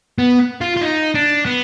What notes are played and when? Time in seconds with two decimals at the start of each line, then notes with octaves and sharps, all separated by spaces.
0.18 B3
0.61 F4
0.76 F4
0.81 D#4
1.15 D4
1.46 B3